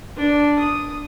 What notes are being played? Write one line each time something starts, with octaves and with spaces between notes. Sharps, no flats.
D4
D#6